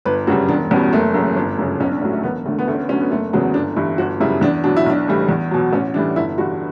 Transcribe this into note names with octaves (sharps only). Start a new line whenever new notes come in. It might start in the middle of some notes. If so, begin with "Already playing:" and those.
G1 B4
F#2 C#3 G3 F#4
E1 D4
E2 B2 G3 C#4
F#1 A3
F#2 C#3
G1
F#2 C#3
B1 C#4
D4
A2 F#3 C#4
A3
E1 B3
D2 D3 A3
B3
D2 A3
C#4
B3
D3 F#3 C#4
B3
F#1 A3
E2 C#3 F#3 B3
G1 D4
G2 E3 E4
G1 F#4
F#2 C#3 G3 E4
E2 D4
B2 F#3 D4
E4
B1 D4
A2 E3 G3
E2
B2 F#3
A1 C#4
A2 E3 G3 D4
G1 E4
G2 E3 F#4